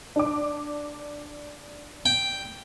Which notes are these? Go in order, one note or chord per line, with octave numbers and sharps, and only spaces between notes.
D4 D6
G5